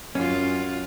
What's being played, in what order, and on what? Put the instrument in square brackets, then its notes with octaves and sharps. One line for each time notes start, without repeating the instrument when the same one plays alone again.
[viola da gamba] F#2 F4 [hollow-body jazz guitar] C#4